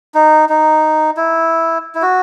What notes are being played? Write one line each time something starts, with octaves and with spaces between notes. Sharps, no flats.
D#4
D#4
E4
E4
F#4